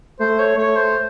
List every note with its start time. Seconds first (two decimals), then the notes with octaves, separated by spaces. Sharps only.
0.20 A3 C5
0.40 C#5
0.57 A3 C#5
0.76 C5